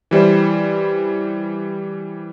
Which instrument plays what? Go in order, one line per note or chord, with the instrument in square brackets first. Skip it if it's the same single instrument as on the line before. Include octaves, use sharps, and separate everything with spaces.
[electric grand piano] E3 G3 E4 C5